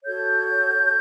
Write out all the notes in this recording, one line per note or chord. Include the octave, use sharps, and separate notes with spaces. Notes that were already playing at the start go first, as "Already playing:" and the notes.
F#4 A4 C#5 G6